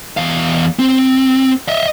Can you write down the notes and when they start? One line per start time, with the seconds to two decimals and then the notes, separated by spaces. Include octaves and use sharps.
0.17 E2 F5
0.79 C4
1.68 D#5 E5